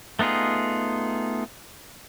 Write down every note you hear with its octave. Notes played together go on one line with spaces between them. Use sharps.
A3 B3 D#4 F4 G#4